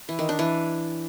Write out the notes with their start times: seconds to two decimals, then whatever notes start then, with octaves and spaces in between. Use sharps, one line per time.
0.09 E3
0.19 D#3
0.29 D4
0.39 E3